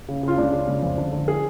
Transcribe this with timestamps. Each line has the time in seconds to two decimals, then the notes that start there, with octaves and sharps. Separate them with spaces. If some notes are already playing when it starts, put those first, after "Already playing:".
0.09 C#3
0.23 C#3 F4
0.38 C#2 D4
0.53 C#3
0.68 C#2
0.83 F2
0.98 D3
1.13 D3
1.28 G#4